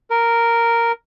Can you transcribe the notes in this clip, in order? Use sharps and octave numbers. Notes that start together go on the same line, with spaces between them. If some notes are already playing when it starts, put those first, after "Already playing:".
A#4